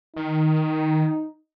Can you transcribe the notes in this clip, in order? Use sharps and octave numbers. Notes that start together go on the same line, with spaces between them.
D#3 D#4